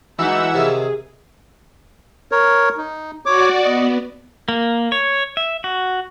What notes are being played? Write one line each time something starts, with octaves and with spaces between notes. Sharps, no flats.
E3 F#3 G#3 D#4 E5 F#5 E6
C3 D#3 G#4 F5
A#4 C#5
D#4
F#4 C#5 D5 D6
B3 D#5
A#3
C#5
E5
F#4